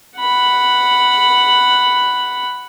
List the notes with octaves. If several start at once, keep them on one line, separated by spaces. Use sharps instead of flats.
F#5 B5